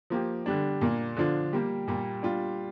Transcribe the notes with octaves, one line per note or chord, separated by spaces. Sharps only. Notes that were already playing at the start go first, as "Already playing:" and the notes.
F3 A#3 G4
D3 G3 D4
A#2 A#3 D4
D3 F3 D4 F4
G3 A#3 G4
A#2 G3 A#3
G3 D4 F4